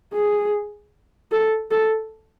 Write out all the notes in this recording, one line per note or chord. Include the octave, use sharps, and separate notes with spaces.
G#4
A4
A4